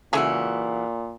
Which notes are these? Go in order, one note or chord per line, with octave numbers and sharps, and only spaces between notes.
A#2 C#3 E3 G#3 A3 F#4 G#4